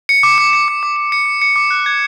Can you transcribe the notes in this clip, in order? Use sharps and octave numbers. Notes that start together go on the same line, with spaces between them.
C#7
D6
D6
C#7
D6
D6
D6
C#7
D6
C#7
D6
F#6
G#6